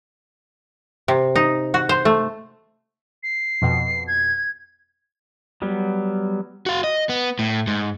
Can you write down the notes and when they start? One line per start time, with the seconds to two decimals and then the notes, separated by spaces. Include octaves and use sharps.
1.08 C3
1.36 D#4
1.74 F#4
1.89 C5
2.05 A3
3.23 C7
3.62 F2 B2
4.07 G#6
5.62 F#3 G3 B3
6.66 F#4 F5
6.84 D#5
7.09 B3
7.39 A2
7.67 G#2